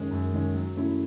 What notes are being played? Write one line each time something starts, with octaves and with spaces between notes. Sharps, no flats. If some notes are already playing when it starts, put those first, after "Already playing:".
Already playing: F#2 D#3 G#3 C#4
F#2
D#3 G#3 C#4
F#3
A3 C#4 E4